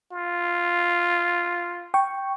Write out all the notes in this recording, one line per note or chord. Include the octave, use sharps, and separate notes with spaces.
F4
G5 C#6